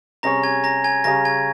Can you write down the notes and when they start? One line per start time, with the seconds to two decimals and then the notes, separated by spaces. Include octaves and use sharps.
0.23 C3 G3 C#4 G#4 C#5 A#5 A#6
0.43 G#5 G#6
0.64 A#5 A#6
0.84 G#5 G#6
1.04 C#3 G3 C#4 G#4 A#5 A#6
1.25 G#5 G#6